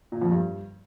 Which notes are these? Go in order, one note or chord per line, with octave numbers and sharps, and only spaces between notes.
A#2
F2
G2